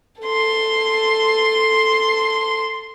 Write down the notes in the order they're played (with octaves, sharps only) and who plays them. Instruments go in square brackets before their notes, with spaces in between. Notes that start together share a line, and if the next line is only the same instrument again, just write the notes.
[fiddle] A4 C6